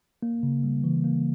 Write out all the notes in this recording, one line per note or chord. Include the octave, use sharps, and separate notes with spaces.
A#3
C#3
G3
E3
A#3